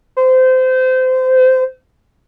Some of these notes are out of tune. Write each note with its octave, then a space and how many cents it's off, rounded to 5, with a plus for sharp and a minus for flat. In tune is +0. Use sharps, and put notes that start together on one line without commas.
C5 -25